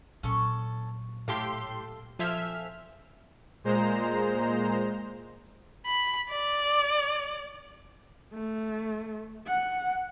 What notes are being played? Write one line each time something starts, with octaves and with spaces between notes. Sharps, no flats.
A#2 F#3 C#4 A4 C#6
A2 G4 A4 F5 C6
F3 C4 A4 E5 G#5 F6
A#2 G#3 C5 A#5
B5
D5
A3
F#5